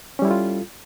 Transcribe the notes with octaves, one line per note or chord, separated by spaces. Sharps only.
G3 C#4 E4 F4 A4